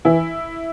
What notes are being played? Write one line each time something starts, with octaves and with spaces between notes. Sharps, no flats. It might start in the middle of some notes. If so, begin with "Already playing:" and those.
E3 E4